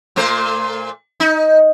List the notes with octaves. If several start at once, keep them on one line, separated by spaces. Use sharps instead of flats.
A#2 A3 C5
D#4